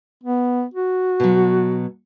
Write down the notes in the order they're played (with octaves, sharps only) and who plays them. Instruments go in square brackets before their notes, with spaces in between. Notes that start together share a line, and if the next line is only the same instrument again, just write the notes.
[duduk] B3
F#4
[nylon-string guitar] B2 F#3